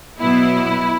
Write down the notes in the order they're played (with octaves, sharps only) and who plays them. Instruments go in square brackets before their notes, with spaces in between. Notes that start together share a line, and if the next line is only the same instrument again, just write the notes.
[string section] B2 F#3 B3 E4